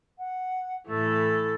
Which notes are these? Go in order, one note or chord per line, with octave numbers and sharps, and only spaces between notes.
F#5
A2 E3 A3 A4